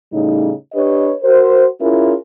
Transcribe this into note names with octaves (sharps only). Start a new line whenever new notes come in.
A2 C#3 G3 D#4
D4 G4 B4 C#5 D#5
F#4 A#4 C5
C#4 E4 F4 G#4 A#4